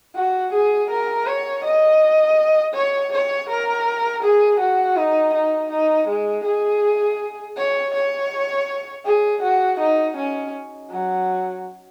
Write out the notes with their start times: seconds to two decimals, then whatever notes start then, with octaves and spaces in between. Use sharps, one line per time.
0.15 F#4
0.52 G#4
0.89 A#4
1.26 C#5
1.64 D#5
2.74 C#5
3.12 C#5
3.49 A#4
4.22 G#4
4.60 F#4
4.96 D#4
5.34 D#4
5.70 D#4
6.08 G#3
6.45 G#4
7.57 C#5
7.93 C#5
9.05 G#4
9.42 F#4
9.79 D#4
10.16 C#4
10.90 F#3